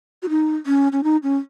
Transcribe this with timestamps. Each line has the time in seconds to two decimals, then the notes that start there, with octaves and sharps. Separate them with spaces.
0.23 F#4
0.29 D#4
0.66 C#4
0.92 C#4
1.04 D#4
1.23 C#4